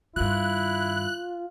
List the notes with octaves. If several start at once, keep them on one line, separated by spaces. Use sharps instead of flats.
G2 D#3 E4 F4 F#6